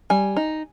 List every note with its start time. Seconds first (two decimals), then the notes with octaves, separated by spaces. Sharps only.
0.10 G3 G#5
0.36 D#4